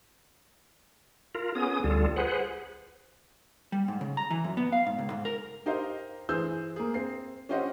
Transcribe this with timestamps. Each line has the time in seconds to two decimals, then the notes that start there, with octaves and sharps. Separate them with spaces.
1.35 F4 A#4
1.55 B3 C#4 G#4 D#6
1.84 D2 G3 F4 A4
2.16 G#4 B4 C5 F#5
3.72 G3
3.88 G#2
4.01 C#3
4.17 A#5
4.31 E3
4.45 F#2
4.57 B3
4.72 F5
4.86 G#2
4.98 C#2
5.10 G#2
5.25 A#4
5.66 D#4 G4 A#4 C5 D#5 F5
6.29 E3 G#4 C5 E6 G6
6.76 A#3 G#4
6.94 C4 C7
7.49 C#4 F4 G4 C5 D#5 F#5